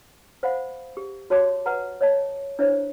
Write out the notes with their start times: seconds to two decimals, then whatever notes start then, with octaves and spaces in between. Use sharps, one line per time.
0.43 C5 F5 F#5 B5
0.97 G4
1.30 F#4 C#5 A5 C6 D6
1.66 B4 F#5 A#5
2.01 C#5 D#5 E5 A5
2.59 D4 E4 C5 C#5 E5